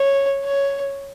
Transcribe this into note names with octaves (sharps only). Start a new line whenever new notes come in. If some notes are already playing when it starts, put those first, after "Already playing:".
Already playing: C#5
C#5